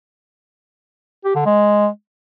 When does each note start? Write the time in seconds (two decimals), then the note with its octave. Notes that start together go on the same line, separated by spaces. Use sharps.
1.25 G4
1.35 D3
1.46 G#3